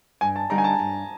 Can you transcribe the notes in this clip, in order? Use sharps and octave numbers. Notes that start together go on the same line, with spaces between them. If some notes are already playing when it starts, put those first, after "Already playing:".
G2 G#5
A5
D3 G3 A#3 D#4 A#5
G#5
A5
G2